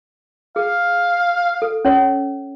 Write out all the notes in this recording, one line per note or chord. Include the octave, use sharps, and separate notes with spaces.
G#4 F5
A4
C#4 C#5